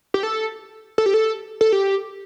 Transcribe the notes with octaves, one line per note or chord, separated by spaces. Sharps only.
G4
A4
A4
G4
A4
A4
G4